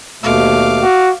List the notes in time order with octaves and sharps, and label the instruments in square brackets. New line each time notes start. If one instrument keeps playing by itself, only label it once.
[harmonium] D#2 B2 A3 [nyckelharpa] F5 D6
[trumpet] F#4